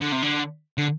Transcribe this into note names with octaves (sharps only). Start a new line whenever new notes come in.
D3
C3
D3
D3